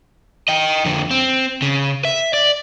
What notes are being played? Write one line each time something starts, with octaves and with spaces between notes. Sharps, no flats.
D#5 G5
F2 D3
C4
C#3
E5
D5